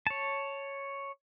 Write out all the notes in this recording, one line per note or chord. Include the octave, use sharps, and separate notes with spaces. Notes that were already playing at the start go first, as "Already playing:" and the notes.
C#5 A5